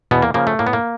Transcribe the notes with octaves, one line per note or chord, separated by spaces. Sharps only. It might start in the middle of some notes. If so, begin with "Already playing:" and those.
E2 B2 B3
A#3
C#3 F3 A#3
A3
A2 A#3
B3
A#3